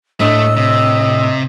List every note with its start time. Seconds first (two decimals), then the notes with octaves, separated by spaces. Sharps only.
0.20 A2 A3 D4 D#5 E6
0.57 C3 D#5